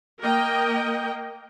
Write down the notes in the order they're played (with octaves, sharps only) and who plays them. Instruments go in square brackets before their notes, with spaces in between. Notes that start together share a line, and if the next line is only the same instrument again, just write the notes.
[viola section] A#3 A#4 D#5 G5